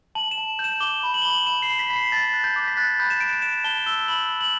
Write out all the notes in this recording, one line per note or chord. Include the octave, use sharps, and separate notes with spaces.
A5 F#7
E7
A5
G6
E7
D6 G7
B5
F#7
B5 G7
F#7
B5 E7
C7
B5
B6
B5 B6
C7
A5 A6
F#6
G6
D6
B6
F#6 A6
B5 G6
E7
F#6 D7
D7
G6 E7
A5 G7
E6 G7
B5 F#7
G6
F#7